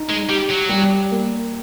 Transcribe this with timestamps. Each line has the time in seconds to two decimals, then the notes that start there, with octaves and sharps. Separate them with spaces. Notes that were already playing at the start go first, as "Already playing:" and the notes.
Already playing: D#4
0.10 G#3
0.29 G3 G4
0.50 F#3
0.69 G3
1.11 A#3